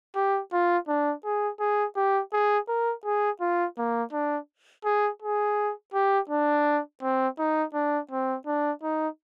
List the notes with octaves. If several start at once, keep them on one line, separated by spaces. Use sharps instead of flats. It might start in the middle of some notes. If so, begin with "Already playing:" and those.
G4
F4
D4
G#4
G#4
G4
G#4
A#4
G#4
F4
A#3
D4
G#4
G#4
G4
D4
C4
D#4
D4
C4
D4
D#4